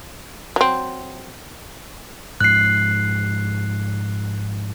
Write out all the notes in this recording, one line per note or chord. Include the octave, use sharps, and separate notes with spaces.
F#3 C4
G#2 F3 F#6 C7